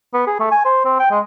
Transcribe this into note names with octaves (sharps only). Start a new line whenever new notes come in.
B3
G#4
A3
G#5
C5
C4
G5
G#3